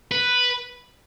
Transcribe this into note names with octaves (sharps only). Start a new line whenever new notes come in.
B4